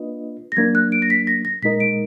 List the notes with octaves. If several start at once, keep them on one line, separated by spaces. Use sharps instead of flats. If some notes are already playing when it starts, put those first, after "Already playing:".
Already playing: A#3 D4 F4 B4 D#5
A#6
F#3 A#3 D4 G#6
F#6
D7
A#6
B6
A#6
A#6
A#2 G#3 D#4 A#4 D#5 B6
D7